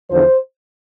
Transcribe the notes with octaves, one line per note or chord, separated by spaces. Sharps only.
E2 D3 F3 C5